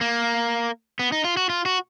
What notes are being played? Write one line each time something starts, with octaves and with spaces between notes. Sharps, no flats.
A#3
B3
D#4
F4
F#4
F4
F#4